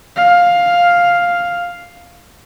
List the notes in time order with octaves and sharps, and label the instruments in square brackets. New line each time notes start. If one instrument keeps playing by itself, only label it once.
[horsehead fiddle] F5